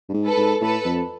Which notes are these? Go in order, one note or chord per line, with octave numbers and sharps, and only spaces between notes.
G2
G#2
A4 B4
G#2
A2 A4 B4
F2